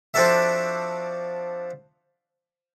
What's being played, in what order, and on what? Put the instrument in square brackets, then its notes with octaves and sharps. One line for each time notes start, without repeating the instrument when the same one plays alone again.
[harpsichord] F3 C4 D4 F#4 A4 E5